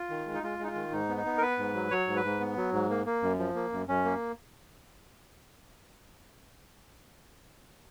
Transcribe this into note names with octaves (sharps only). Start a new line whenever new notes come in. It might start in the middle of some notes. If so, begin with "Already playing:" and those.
Already playing: F4
D#3
G#3
D#4
G#3 F4
G#3 D#4
F4
D#3
G#2 D#4
B3
D#4
B3
A#4
B3 B4
G#2
F#3
F#3 C#5
G#2
B4
G#2
B3
F#3
G#2
A#3
A#3
F#2
F3
A#3
F#2
F#2 C#4
A#3